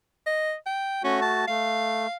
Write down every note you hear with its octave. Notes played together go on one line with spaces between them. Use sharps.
D#5
G5
A3 C#4 F#4
A5
A3 F5